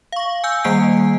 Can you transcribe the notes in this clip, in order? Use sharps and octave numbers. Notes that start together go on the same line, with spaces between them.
F5 C#6
G#5 E6 G6
D#3 G3 A#3 G#5 C7 D7